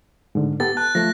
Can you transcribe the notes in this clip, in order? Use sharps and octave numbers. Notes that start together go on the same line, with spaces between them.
G#2 D3
B3 G4 A4 A6
A5 F#6
F3 A3 A#6